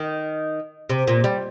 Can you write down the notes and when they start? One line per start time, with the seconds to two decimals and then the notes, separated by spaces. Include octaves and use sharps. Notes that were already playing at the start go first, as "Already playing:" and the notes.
Already playing: D#3
0.89 C3
1.07 A#2
1.24 G3